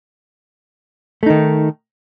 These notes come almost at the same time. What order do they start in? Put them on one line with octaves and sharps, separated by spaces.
A3 D#4 D#3